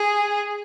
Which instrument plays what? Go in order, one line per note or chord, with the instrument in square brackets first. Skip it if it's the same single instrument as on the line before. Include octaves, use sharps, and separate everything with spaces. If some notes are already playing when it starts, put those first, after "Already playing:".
Already playing: [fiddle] G#4